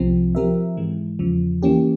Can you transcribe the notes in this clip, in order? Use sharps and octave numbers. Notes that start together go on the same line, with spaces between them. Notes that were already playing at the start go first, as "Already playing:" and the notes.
Already playing: C2 C3 F3 C4
F3 C4 G4 A#4 E5
G#2 E3 G#3
E2 C#3 F3
E3 A#3 C#4 G4